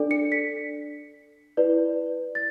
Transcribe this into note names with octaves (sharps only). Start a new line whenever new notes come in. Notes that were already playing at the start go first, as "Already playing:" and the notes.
Already playing: D4 A4 D5
C#7
B6
E4 B4 D5
A6